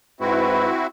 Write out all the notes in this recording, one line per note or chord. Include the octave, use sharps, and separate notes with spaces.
G#2 C4 E4 F#4 B4